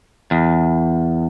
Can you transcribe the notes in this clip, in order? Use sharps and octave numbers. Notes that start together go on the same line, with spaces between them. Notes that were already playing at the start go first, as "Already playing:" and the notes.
E2